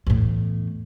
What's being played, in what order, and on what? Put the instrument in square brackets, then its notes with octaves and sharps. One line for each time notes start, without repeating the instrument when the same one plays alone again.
[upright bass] E2 A2